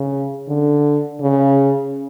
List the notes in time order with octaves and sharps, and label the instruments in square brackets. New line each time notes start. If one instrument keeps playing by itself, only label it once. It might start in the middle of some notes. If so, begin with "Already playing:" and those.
Already playing: [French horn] C#3
D3
C#3